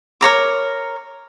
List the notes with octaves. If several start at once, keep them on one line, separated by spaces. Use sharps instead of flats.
A#4 C#5 A#5 D6